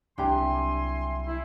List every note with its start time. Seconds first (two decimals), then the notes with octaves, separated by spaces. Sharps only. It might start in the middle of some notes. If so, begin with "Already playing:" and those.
0.18 C2 F#3 D4 E4 G4 G#5 A#5 C6
1.26 E4